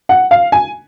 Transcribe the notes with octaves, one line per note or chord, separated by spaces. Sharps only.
F#5
F5
G#5